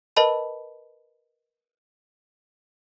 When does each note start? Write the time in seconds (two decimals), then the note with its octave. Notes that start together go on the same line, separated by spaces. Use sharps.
0.17 A#4 B4 D#5 A5 B5